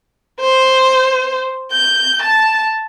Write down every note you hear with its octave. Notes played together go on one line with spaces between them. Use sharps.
C5
G6
A5